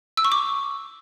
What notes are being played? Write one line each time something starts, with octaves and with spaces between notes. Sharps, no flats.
E6
C#6
D6